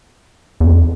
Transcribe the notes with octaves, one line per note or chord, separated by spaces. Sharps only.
E2
F2